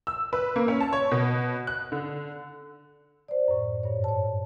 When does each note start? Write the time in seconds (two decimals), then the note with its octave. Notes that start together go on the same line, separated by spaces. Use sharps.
0.07 E6
0.33 B4
0.56 A#3
0.68 C#4
0.80 A5
0.93 C#5
1.11 B2
1.67 F#6
1.92 D3
3.28 C5 D5
3.48 F#2 A2
3.83 G2 C#5
4.04 C#5 A5